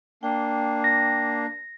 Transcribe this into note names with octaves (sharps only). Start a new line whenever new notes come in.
A#3 D4 G5
A#6